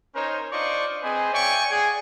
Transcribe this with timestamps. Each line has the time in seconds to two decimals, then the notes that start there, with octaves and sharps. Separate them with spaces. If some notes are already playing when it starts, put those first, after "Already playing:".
0.15 C#4 D#4 A#4 C5 C#5 A#5
0.52 D4 F4 C5 D5 D#5 C#6
1.03 C4 G#4 B4 C5 D#5 G#5
1.33 C#5 D5 E5 G5 G#5 C#6
1.70 G#4 D5 F#5 G#5